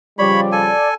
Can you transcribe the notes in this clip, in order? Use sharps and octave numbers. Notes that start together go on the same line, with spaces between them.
C#3 F3 G3 C#5 D5 B5
A4 G#5